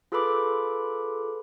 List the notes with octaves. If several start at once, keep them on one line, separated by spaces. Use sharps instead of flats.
F4 G#4 A4 B4 B5 D6